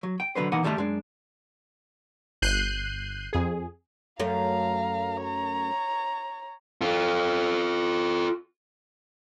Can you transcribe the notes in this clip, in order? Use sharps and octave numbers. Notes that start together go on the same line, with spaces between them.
F#3
G5
B1 D3 F#3 B4 C5
B2 E3 A#3 D#4 F#5 G#5
D#3 G3 A3 G4 A5
F#2 G#3 D4
G1 F#6 G6 C7 D#7
F2 G#4
F#2 A3 F5 A#5
C#5 A#5
F4 A4